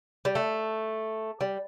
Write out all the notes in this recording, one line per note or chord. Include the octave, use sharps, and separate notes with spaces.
G3
A3
G3